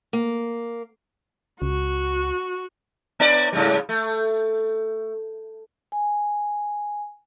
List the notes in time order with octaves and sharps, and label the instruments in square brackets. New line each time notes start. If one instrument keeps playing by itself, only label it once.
[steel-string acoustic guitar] A#3
[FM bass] C#2 [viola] F#4
[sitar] B3 B4 D5
G#2 C#3 G3
A3
[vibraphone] G#5